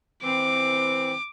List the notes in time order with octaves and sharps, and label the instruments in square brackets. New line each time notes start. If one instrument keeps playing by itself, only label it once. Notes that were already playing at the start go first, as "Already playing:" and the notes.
[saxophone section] E3 C4 [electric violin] D6